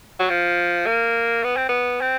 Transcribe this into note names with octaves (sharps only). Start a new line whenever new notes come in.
F#3
F3
A#3
B3
C4
B3
C4